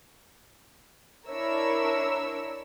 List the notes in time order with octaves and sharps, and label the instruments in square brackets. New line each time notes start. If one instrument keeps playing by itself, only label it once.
[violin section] D4 E4 A#4 C#5 E6